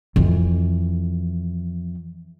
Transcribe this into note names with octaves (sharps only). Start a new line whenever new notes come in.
F2 E3